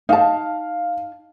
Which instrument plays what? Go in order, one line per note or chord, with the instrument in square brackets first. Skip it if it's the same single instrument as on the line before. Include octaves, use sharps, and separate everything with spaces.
[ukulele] D#4 A5 [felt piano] F5